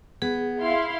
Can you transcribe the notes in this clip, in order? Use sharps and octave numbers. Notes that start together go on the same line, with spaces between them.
B3 G#4
E4 F5 C6